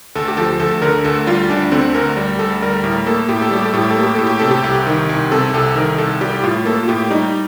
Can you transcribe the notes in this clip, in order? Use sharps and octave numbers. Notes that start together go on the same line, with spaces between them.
D2 A4
G4
F3 A4
D2 A4
D3 A#4
D2 A4
G3 F4
D2 D4
D3 C4
D2 A#4
G3
D2 A4
G3 A#4
A2 A#4
A#3 A4
A2 G4
A4
G3 G4
A4
A2 G4
A4
A#3
G4
A2 A4
G4
C3 A4
G4
C2
D#3
C2
C3 A4
C2 A4
D#3 A#4
C2 A4
G3 G4
A2 F4
A#3 A4
F4
A2 G4
G3 D#4